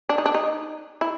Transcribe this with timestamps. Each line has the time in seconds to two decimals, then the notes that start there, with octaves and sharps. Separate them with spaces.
0.09 D4
0.18 D#4
0.26 D4
0.34 D#4
1.01 E4